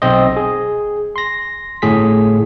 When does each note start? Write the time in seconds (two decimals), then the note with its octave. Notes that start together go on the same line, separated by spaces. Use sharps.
0.02 B1 C4 C5 D#5
0.37 G#4
1.16 C6 A#6
1.82 G1 A2 G#4 B6